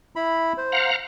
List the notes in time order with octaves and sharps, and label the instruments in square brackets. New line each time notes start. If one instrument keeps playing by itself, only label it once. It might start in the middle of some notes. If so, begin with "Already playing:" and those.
[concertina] E4 B5
C5
[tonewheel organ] F5 F#5 A#5